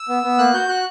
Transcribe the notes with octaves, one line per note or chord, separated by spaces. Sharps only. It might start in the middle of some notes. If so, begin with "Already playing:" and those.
Already playing: E6
B3
B3
A#3 F#6
F#4 G6
F#4 F#6